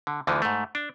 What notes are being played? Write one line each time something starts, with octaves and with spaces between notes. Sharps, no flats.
D3
D2 D3 E3 F3
G#2 A3
D4